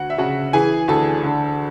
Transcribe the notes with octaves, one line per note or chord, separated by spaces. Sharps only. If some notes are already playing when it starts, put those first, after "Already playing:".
Already playing: D2 F#4 F#5
E5
C#3 F#4 F#5
E3 G#4 G#5
D2 A4 A5
D3